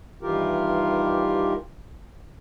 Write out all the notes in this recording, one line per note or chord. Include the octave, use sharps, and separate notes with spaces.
G2 D#3 E3 F4 G4 A#4